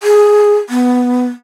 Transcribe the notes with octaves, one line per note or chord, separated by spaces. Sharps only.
G#4
B3